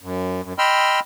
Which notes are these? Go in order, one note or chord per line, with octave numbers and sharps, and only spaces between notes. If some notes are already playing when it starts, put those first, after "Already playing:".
F#2
F#2
D#5 G5 B5 C6 E6 F6